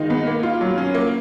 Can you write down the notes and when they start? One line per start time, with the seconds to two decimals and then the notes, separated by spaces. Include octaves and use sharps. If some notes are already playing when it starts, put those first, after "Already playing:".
Already playing: D#3 G#3 D#4 F4
0.10 B3
0.27 A#3
0.43 F4
0.61 F#3
0.78 C#4
0.95 A#3